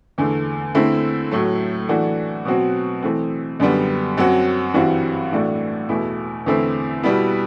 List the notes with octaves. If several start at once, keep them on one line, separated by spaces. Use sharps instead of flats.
E2 D3 A3
D3 A3 C4 E4
A2 F#3 A3
E3 A3 D4 F#4
B2 F#3 C4 F#4
E3 A3 C4
F#2 D3 G3 B3
F#2 F#3 C4 F#4
G2 E3 G3 C4 F#4
A2 E3 A3 D4 F#4
E2 B2 A3 E4
E2 D3 A3 C4 E4
B2 G3 B3 E4